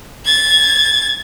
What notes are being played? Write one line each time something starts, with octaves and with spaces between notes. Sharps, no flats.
G#6 A6